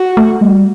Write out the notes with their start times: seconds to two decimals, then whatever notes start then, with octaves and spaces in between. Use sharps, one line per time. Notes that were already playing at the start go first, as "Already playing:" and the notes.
Already playing: F#4
0.17 A3
0.41 G3